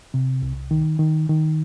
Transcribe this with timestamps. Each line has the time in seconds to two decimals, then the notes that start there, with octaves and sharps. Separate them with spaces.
0.14 C3
0.42 C2
0.71 D#3
0.99 D#3
1.29 D#3